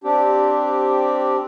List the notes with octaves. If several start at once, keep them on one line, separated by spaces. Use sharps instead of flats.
C4 D4 G4